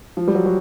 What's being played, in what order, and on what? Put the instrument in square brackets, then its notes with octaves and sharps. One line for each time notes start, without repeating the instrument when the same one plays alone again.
[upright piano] F3
G3
F#3
F#3